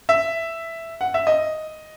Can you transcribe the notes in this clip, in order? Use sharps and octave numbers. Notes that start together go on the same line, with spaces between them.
E5
F#5
E5
D#5